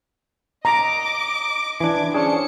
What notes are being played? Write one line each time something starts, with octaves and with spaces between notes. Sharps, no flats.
D#5 A#5 D6
E3 D4 D6 G#6
C#4 D4 G#4 C5 C#7